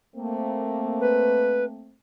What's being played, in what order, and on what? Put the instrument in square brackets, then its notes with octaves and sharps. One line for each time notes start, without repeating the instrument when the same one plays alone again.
[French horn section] A3 A#3 C4
[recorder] B4